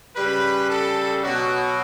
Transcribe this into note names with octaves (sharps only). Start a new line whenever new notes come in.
C#3 G3 B4
A4
B2 F#3 F#4